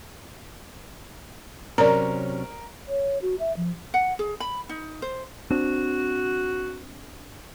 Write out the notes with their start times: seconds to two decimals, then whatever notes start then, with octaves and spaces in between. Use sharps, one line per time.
1.78 C3 F#3 C#4 A#4 D5 A#5
2.88 C#5
3.22 F#4
3.40 E5
3.57 F3
3.94 F#5
4.19 G#4
4.40 B5
4.69 D#4
5.02 C5
5.51 C4 D4 F#4